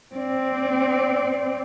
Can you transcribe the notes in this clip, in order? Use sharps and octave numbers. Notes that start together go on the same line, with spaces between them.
C4 D5